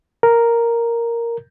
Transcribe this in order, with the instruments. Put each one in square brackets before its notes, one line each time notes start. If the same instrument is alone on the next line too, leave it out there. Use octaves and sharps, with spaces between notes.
[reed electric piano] A#4